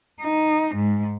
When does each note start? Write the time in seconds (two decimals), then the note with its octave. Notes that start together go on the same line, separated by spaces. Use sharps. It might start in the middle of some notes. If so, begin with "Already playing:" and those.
0.22 D#4
0.75 G#2